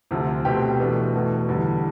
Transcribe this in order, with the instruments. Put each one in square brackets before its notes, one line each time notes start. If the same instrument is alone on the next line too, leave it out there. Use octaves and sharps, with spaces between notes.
[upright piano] D2 C3 F3
B2 A3 C4 G4
E2 B2 A3 D4
E2 B2 A3
E2 D3 G3